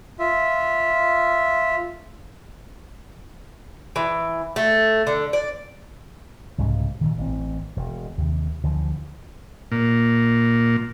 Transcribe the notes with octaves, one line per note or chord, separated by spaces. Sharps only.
F4 E5
E3
A3
D3
D5
C2 G#2 C#3 C#4
A#2 D#3
A1 E3 C4
E1
D#2 C3
D2 D3 E3 F3
A#2